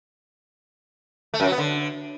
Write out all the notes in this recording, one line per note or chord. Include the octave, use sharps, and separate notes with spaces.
A3
F#2
F#3
B3
D3